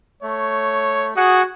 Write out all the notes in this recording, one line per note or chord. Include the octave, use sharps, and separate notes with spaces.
A3 C#5
F#4 G#4 F#5 D#6